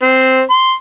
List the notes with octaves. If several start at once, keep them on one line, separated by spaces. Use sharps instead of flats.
C4
C6